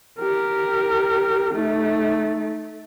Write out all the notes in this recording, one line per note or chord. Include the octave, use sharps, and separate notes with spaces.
G4 A#4
A3 D#4